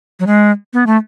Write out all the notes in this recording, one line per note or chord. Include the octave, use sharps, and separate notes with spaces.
F#3
G#3
B3
A3